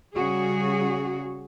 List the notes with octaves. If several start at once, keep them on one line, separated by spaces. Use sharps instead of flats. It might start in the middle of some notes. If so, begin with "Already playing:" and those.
C#3 G3 F#4 G#4